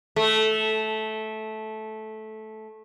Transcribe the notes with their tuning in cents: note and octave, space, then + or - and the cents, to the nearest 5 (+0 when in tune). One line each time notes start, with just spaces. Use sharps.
A3 -15